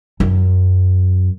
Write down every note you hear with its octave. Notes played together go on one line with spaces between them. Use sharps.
F#2